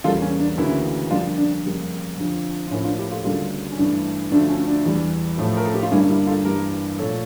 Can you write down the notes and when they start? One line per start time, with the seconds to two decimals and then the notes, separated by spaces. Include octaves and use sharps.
0.04 E2 C#3 G3 A#3 F4 A4
0.22 C#4
0.40 D4
0.58 D2 C#3 E3 A#3 C#4 E4
1.10 F2 D3 G3 A#3 D4 F4
1.38 D4
1.65 F2 C#3 G3 A#3
2.18 F2 D3 F3
2.67 F4
2.71 A2 F3 A#3 C#4 E4
2.84 D4 F4
2.98 E4 G4
3.11 F4 A4
3.24 D2 C#3 G3 A#3 F4 A4
3.72 C#4
3.78 G2 E3 A3 D4
4.32 D2 D3 F3 A3 D4
4.49 C#4
4.68 D4
4.85 E2 E3 G3
5.38 A2 F3 A3
5.57 A#4
5.66 A4
5.74 G4
5.83 F4
5.92 G2 D3 G3 A#3 C#4 E4
6.09 E4 G4
6.27 F4 A4
6.45 G2 E3 A#3 G4 A#4
6.98 A#2 F3 A3 A4 C#5